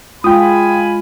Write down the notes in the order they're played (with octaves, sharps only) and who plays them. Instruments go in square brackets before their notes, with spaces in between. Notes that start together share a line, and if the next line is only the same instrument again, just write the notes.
[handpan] G#3 F4 [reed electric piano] G5 D#6 [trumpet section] G#5 B5